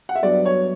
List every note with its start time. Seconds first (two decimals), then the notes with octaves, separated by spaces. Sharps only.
0.09 F#5
0.15 E5
0.22 G2 F#3 B3 D4 D5
0.46 C#5